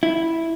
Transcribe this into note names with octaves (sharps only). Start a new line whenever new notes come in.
E4